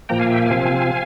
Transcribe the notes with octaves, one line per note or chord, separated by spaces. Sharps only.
A#2 F3 A#3 G5 A#5
F5 G#5
E5 G5
F5 G#5
C3 F3 C4